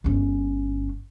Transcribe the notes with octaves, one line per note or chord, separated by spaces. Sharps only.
G1 C#4